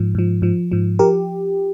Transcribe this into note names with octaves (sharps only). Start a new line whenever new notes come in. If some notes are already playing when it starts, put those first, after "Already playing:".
Already playing: G#2 F3
G#2 F3
G#2 F3
G#2 F3
F3 G4 A#4